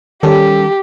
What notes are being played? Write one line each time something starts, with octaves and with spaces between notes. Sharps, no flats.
D#3 G3 C#4 G4 A4